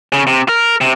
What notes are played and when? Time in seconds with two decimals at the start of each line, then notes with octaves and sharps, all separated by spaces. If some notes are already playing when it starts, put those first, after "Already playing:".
0.13 C#3
0.27 C3
0.48 A#4
0.81 C3